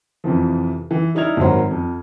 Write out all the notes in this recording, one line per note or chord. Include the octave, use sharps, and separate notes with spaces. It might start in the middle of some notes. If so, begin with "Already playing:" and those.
F2 C3 E3 F3
E3
G3 D#4 E4 F6 G#6 F7
G#1 D#3 F#3 C5
F2